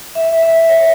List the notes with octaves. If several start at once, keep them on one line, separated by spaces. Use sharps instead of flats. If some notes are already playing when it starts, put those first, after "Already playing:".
E5
E5
C#5